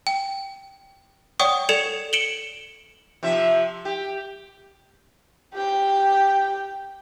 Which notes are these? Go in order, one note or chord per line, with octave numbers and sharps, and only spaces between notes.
G5
C#5 D5 F#5 G5 C#6 D#6
A4 D5 G#6 C#7 E7 F7
C#7 D7 E7 F#7 G7
C3 F3 E5
G4
G4 G5